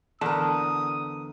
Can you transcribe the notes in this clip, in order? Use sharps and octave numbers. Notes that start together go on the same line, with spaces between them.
E2 D3 A#4 A5 D#6